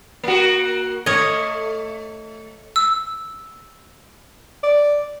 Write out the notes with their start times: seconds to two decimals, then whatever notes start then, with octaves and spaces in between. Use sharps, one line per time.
0.23 A#3 F#4
1.06 A3 C#5 D#5
2.76 E6
4.63 D5